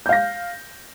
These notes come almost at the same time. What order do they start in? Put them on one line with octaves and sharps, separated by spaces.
G6 F5 A#6